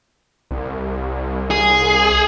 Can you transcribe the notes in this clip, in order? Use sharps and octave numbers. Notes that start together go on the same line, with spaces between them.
C2
G#4